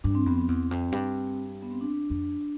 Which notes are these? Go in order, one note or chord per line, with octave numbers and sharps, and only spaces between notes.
G2 D4
C4
F2 B3
C4
E2
F2
G2
B3
C4
D4
F2